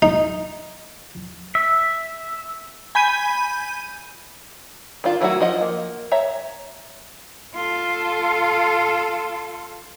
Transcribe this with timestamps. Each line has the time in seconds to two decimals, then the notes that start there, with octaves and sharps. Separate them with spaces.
0.02 D#4
1.55 E5
2.95 G#5 B5 G6 D#7
5.04 D#3 D4 F4
5.21 D#3 F#3 A3 E4 F#4
5.40 F3 D#5 F#5
5.61 A#3
6.11 C#5 E5 A#5
7.54 F4 A4